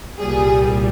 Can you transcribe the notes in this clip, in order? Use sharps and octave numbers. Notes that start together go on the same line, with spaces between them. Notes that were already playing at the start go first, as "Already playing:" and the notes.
C2 A#2 G3 G#4